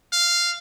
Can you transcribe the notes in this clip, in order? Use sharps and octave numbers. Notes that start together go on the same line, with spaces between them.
F5